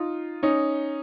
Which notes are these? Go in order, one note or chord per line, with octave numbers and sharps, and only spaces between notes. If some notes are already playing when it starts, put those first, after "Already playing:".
Already playing: D#4 F4
C#4 D#4